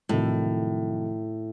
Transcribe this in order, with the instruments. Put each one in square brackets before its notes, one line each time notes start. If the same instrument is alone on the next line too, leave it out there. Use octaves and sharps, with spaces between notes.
[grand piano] F2 C3 D#3 F#3 [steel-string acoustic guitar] A2